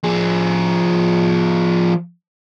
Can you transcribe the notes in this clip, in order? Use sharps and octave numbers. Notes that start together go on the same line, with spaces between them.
F3 G#4